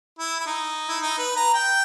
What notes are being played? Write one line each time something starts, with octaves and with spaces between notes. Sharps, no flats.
E4
E4
D#4
E4
D#4
B4
A#5
G5